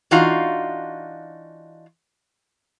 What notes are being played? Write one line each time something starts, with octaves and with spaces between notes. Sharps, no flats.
E3 D4 D#4 F4 F#4 F5